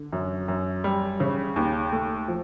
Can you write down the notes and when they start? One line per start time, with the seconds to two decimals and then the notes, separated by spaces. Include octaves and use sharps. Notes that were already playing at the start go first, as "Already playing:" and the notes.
Already playing: D3
0.12 F#2
0.48 F#2
0.84 G3
1.20 C#3
1.56 D#2
1.92 A3
2.28 F3